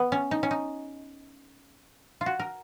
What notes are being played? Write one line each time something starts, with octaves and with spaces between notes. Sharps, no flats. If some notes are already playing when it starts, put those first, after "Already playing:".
Already playing: B3
C#4
D#4
C#4
D#4
F4
F#4
A#4